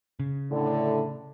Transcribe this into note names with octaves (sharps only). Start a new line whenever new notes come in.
C#3
A2 D3